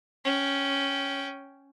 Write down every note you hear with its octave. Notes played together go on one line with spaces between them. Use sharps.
C#4 G5